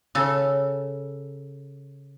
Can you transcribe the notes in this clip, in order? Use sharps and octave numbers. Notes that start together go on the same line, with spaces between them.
C#3 A4